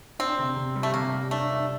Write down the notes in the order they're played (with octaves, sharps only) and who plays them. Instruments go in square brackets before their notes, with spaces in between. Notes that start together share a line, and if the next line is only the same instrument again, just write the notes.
[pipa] C4 [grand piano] D4
[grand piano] C3
C3
G3
[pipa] A3
[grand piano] C3 [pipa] A#3
[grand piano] G3
[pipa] A3 [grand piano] D4
[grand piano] D4